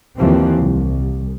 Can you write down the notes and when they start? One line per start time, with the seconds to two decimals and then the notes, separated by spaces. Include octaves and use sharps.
0.16 D#2 E3 F3 C4
0.61 C2